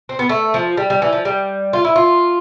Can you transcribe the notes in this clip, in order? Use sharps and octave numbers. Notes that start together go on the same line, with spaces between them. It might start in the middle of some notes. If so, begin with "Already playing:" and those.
C4
B3
A3
F3
G3
G3
E3
F3
G3
F4
E4
F4